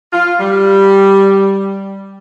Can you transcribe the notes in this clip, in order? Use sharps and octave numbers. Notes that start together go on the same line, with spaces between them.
F4
G3